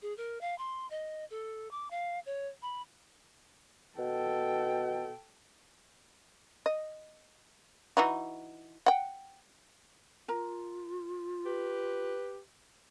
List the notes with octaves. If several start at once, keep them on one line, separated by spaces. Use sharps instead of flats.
G#4
A#4
F5
C6
D#5
A4
D6
F5
C#5
B5
B2 A4 G5
D#5
E3 D#4 F#4
F#5 G5
F4 A#4 A#5
G4 B4